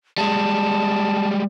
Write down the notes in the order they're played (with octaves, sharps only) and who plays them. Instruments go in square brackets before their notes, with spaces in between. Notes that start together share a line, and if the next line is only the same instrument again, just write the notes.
[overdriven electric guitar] G3 G#3 [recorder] A5